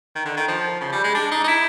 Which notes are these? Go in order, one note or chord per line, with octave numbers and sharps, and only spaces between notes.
D#3
D3
D#3
F3
C#3
G3
G#3
D4
D#4
D#4
E4